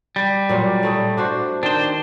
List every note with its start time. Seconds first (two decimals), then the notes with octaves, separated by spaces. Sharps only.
0.16 G3
0.49 A#2 F#3 F4
0.83 A3 E4 D#5
1.17 D4 F#4 C5
1.63 D#3 D4 C5